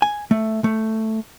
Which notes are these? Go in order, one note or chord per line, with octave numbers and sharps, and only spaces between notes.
G#5
A3
A3